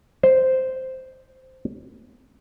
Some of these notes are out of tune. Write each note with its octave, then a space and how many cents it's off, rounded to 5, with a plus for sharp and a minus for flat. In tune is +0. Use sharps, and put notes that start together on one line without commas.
C5 -5